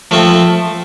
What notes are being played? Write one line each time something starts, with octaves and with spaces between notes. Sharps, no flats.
F3 A3 C4